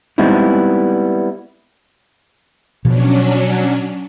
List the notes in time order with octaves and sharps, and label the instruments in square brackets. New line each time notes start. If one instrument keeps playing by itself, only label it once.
[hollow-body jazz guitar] G3 G#3 B3 C4 D#4 E4
[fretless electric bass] B2 F3 [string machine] F#3 C#4 D4